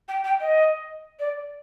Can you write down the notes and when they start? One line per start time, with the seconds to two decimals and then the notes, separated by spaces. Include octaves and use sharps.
0.08 G5
0.24 G5
0.40 D#5
1.19 D5